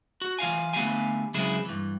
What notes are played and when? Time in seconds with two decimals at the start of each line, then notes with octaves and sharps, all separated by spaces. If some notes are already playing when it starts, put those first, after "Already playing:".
0.21 F#4
0.39 E3 F4 F5 G#5
0.73 D3 A3 B3 G4 F5 G#5
1.34 C#3 F#3 G#3 C4 E4 G#4
1.65 G2 E3